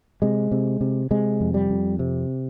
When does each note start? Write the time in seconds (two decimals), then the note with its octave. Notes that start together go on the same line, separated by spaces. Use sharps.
0.22 C3 G#3
0.52 C3
0.81 C3
1.11 C3 G#3
1.41 F2
1.54 G3
1.70 F2
1.99 C3